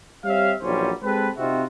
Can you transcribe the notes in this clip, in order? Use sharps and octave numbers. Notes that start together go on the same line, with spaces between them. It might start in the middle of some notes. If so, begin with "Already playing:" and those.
G3 C4 C#5 E5 F5
A#1 E3 F#3 G3 C#4 C5
G#3 C4 G4 A4 B4
C3 C4 D#4 F4 F#4 E5